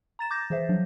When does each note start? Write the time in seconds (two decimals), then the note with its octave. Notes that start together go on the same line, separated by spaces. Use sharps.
0.19 A#5 A6 E7
0.31 D6 G6 A6 A#6
0.50 E3 G#4 C5 E5
0.69 F3 F#3 D4